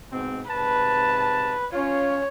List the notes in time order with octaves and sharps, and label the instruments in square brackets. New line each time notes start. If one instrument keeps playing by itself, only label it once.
[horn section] G#2 B2 C4
[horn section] G#2 C3 A5 [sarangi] B4
[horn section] C#4 F4 [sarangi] C#5